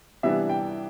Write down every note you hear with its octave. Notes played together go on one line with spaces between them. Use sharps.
C3 E3 G3 B3 D4 E5
G5